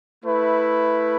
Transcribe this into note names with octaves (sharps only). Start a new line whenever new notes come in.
A3 E4 B4